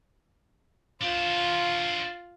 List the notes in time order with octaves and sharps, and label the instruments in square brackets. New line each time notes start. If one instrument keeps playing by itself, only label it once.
[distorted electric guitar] D4 C5 [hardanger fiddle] F4 F5